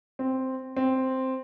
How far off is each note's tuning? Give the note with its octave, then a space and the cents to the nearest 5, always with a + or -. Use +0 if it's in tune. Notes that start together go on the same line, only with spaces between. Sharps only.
C4 +0
C4 +0